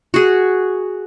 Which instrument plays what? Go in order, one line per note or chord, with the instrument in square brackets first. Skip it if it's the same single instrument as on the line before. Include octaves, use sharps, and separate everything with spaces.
[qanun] F#4 G#4